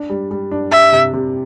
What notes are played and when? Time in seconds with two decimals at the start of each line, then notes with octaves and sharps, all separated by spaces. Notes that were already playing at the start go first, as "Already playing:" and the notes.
Already playing: D4
0.10 G3
0.31 G3
0.51 D4
0.71 G4 E5
0.92 C3
1.13 C3